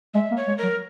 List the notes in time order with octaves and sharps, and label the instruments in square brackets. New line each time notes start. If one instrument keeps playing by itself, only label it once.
[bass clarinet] G#3 [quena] E5
[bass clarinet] A#3
[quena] C#5
[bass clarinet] G#3
[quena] A#4
[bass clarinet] F#3